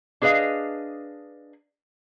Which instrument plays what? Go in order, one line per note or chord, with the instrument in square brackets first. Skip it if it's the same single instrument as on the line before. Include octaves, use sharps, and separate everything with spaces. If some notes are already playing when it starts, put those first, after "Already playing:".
[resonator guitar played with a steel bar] D4 G#4 B4 D#5 F5